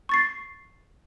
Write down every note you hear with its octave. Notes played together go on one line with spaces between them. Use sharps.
C#6 A6 C7